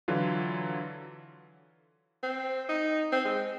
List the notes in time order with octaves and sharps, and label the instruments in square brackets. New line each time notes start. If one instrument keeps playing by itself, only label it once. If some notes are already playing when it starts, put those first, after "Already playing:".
[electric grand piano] D3 E3 F#3 F4
[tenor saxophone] C4
D#4
C4
G#3